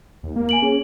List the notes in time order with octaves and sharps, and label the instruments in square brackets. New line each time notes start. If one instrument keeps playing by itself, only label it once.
[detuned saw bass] D#2
A#3
[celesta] G#5 D7 F#7
[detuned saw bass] C#4 [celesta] G#4